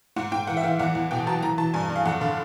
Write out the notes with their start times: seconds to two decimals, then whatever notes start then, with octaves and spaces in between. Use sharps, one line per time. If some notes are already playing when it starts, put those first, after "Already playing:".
0.16 G#2 F#5
0.32 G#2 G5
0.47 E3 F#5
0.57 E5
0.63 E3 F5
0.79 E2 F#5
0.95 E2
1.11 B2 G5
1.27 F#3 A5
1.42 E3 A#5
1.58 E3 A5
1.74 G2 G#5
1.90 G2
1.96 F5
2.05 F2 F#5
2.21 D3 F5